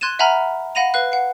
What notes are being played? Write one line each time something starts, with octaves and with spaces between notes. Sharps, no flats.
C6 F#6 G#6 A6 D#7 E7
E5 F#5 G#5 A#5 B5 F6
F5 F#5 B5 A#6 D#7 F7
B4 F5 F#6
F#5 C7